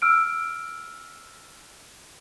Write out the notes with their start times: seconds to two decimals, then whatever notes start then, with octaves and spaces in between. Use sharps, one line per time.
0.02 E6 F6 D7